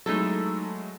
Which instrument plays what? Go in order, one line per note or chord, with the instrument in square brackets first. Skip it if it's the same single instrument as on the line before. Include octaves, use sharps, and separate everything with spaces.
[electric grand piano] F#3 G#3 A3 [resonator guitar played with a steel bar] D#4 E4 A4